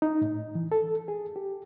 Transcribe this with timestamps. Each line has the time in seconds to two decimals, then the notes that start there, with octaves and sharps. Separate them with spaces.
0.02 D#4
0.21 A2
0.55 E3
0.72 A4
1.08 G#4
1.36 G4